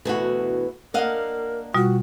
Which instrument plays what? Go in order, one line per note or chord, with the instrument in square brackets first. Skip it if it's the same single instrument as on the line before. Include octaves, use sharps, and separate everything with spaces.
[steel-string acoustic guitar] D2 B2 E3 [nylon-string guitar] A3 F#4
[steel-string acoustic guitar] A#3 D4 [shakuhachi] A#4 [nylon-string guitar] D#5 F5 F#5
[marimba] B2 G3 F4 [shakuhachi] F#4